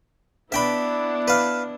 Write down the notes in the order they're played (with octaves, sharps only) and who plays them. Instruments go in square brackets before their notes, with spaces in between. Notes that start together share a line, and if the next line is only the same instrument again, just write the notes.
[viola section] B3 D4 E4 [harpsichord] E5 G5 B5
[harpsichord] B4 F5